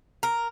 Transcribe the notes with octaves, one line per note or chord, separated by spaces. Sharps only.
A#4